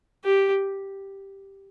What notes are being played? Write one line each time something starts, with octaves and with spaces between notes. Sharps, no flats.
G4